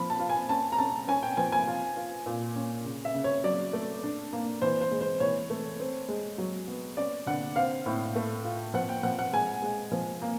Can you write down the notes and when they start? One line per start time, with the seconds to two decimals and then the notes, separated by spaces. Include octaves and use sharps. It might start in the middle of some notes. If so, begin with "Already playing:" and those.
Already playing: F3 B5
0.10 A5
0.20 F4
0.30 G#5
0.49 C#4 A5
0.72 A#5
0.78 C#4 A5
1.08 C#4 G#5
1.23 G5
1.37 F3 G#5
1.52 G#5
1.68 F4
1.96 F4
2.26 A#2
2.56 C#4
2.85 C#3
3.05 E5
3.15 C#3
3.24 C#5
3.44 F#3 D5
3.73 A3
4.03 D4
4.33 A#3
4.62 E3 C5
4.81 C5
4.91 G#3
5.01 C5
5.20 E3 C#5
5.50 A3
5.80 C4
6.09 G#3
6.38 F#3
6.68 B3
6.97 C#4 D5
7.26 D3 F#5
7.56 C4 F5
7.86 A2
8.16 A3
8.45 F4
8.74 F3 F#5
8.89 G5
9.03 F3 F#5
9.19 F#5
9.33 G#3 G#5
9.62 G#3
9.92 F3
10.22 A#3